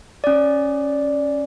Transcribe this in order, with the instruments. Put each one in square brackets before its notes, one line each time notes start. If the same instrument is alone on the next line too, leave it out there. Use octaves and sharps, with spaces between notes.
[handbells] C#4 D5